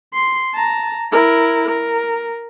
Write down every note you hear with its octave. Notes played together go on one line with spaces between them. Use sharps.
C6
A5 A#5
E4 A#4
A#4